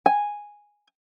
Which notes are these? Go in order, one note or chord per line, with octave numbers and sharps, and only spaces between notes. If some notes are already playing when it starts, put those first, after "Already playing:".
G#5